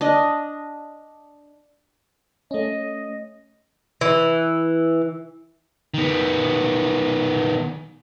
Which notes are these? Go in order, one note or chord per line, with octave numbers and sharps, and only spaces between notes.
D4 D#5
A3 C#4 D#5
E3
D#3 B3